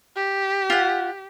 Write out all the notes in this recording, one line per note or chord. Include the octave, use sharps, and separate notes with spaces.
G4
F4 F#5